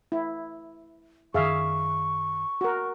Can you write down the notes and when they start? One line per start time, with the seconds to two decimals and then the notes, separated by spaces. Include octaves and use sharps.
0.12 E4
1.34 F#2 D#3 G#4 E5 F5 C#6
2.61 F#4 A#4